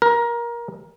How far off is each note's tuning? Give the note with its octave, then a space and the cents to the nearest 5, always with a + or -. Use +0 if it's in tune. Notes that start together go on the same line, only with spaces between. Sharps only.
A#4 +20